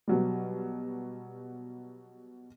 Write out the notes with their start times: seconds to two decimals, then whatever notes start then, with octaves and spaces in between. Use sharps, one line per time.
0.08 B2 F#3 G3